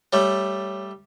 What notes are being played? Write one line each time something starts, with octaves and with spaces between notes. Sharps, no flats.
G3 A3 C#5